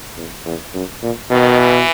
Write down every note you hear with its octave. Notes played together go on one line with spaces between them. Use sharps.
E2
E2
F#2
A#2
B2 D#3
E3